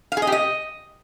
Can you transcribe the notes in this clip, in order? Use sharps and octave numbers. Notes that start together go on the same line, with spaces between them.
F5
G#4
D#5
G4
D#5